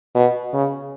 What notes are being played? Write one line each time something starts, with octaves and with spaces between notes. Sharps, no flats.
B2
C#3